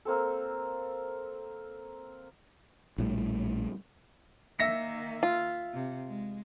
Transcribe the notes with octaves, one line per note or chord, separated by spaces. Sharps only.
A#3 C4 A4
A#1 A2 G3
D#3 A#3 E5 A#6 C#7
F4
C3
G#3